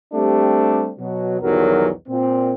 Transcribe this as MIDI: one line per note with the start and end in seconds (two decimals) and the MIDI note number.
0.14 0.91 55
0.14 0.91 57
0.14 0.91 60
0.14 0.91 62
0.14 0.91 67
0.99 1.37 47
0.99 1.37 54
1.41 1.89 35
1.41 1.89 40
1.41 1.89 51
1.41 1.89 54
1.41 1.89 55
1.41 1.89 70
2.09 2.53 46
2.09 2.53 60